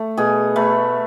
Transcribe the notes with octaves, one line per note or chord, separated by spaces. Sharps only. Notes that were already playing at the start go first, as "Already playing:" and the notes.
Already playing: A3
B2 G#4
A3 B4